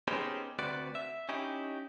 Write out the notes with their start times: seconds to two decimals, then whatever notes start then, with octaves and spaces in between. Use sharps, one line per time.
0.08 B3 C#4 D#4 G4 G#4 C5
0.59 D2 C4 F#4 B4 D5
0.95 E5
1.29 C#4 D#4 E4 G4